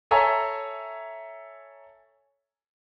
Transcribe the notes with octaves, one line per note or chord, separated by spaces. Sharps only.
A4 C#5 E5 G#5 A#5